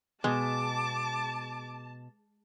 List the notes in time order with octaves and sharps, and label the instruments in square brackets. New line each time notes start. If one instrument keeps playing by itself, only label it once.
[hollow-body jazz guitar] B2 [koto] G#3 [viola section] A5 [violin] D6